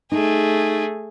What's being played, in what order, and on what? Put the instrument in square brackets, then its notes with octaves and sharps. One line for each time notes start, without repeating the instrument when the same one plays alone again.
[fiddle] A3 G#4 [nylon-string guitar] D#4